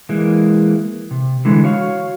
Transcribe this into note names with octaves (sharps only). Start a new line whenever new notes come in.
E3 G#3 A#3
C3
D3 E3 G#3
F#4 C#5 F5